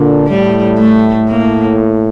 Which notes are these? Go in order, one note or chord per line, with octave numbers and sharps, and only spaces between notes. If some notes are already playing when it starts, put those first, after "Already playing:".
Already playing: A#2 D3
A2 G3
A3
A#3